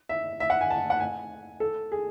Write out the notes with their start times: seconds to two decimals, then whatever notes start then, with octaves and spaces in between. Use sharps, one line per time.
0.09 E5
0.40 E5
0.50 F#5
0.61 G#5
0.70 A5
0.90 F#5
1.00 G#5
1.60 A4
1.92 G#4